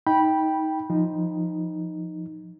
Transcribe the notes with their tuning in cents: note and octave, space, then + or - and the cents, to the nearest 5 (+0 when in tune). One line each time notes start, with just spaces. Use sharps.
D#4 +20 G5 +0 B5 -15
F3 +0 D#4 +0